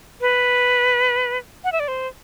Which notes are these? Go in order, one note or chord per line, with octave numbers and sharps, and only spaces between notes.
B4
F#5
E5
D5
C5